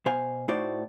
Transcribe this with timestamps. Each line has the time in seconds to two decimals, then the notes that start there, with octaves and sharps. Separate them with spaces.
0.06 B2 C5 F5 G#5
0.48 A2 A3 D#4 F#4 C5 D5